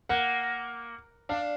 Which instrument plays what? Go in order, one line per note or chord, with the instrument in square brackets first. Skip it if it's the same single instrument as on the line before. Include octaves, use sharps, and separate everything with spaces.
[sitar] A#3 [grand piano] F#5
[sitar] D4 [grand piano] F5